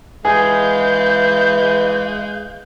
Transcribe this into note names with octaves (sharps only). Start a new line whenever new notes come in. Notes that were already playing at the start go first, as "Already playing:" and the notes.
E3 G#3 G#4 F5 G6